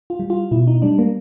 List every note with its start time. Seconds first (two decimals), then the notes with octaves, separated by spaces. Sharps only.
0.10 F4
0.20 G3
0.30 F4
0.51 B2 E4
0.67 D#4
0.82 G3 D4
0.99 A#3